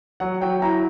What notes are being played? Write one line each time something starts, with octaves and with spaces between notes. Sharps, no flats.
F#3 F#5
F#3 G5
E4 A#5